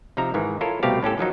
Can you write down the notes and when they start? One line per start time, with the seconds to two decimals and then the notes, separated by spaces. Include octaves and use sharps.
0.17 C3 F3 D#4 E5 A#5
0.34 G#2 D#3 E3
0.61 E4 F4 A4 A#4 C#5
0.83 C2 B2 A3 C4 G4 F5
1.03 A2 C#4 G4 A4
1.18 D#3 F3 F#3 D#4